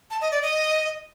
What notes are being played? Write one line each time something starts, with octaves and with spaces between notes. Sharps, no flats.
A5
D#5
D5
D#5